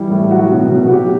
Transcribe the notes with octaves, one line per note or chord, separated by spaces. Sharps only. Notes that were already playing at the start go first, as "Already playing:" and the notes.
Already playing: E3 G3 E4
A2
F#3 F#4
B2
B2
F#4
F#3 G4